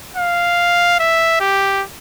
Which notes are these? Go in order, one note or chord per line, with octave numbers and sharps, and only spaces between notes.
F5
E5
G4